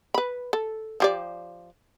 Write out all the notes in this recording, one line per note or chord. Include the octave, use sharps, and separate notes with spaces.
B4 B5
A4
F3 G4 D5